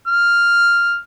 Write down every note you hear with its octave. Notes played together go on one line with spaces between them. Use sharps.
F6